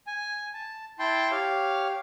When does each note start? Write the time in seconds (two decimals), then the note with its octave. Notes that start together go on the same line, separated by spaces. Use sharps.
0.07 G#5
0.54 A5
0.99 E4 G5 A5 C6
1.32 G4 C#5 F5